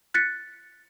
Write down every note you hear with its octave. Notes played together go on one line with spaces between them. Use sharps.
F#6 A6 B6 C#7